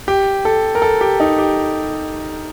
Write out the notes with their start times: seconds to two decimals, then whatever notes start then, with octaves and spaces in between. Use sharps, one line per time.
0.08 G4
0.45 A4
0.75 A#4
0.82 A4
1.01 G4
1.20 D#4
1.38 G4